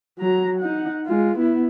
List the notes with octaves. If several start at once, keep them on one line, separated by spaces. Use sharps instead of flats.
F#3 A#5
D#4 F#5
G#3 F4
B3 E4